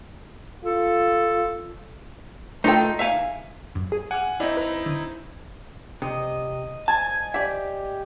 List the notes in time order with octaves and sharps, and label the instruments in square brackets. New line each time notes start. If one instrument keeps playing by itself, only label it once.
[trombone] F4 [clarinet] A4
[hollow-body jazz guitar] A3 F4 A4 [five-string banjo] D#4 G5
[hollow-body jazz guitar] E5 F5 G#5
[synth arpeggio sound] F#2
G#4
[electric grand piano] F#5 G#5 [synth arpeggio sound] D6 F6
[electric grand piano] C4 D#4 E4 [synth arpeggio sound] D5 F5
[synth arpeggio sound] B4 A#5
D3 D#7
[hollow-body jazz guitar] C3 [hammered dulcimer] D#5
[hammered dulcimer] G#5 [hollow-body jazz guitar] A5
[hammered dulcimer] G4 [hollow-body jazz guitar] D5 E5